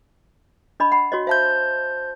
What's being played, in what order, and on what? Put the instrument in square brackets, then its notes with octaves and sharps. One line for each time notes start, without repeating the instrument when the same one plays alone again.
[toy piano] D4 D#5 B5
F#5 B5
F#4 C#5 D#5
[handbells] C5 A5 G6 [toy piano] E5 F5